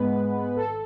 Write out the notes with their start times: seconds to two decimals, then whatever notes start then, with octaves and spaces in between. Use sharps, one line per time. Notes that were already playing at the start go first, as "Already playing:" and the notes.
Already playing: G#2 G#3 B3 B4
0.12 G#2
0.34 G#3 B3
0.56 G#1 A4